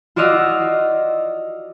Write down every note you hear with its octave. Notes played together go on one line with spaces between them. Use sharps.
F4 F#4 D5 D#5 F5 E6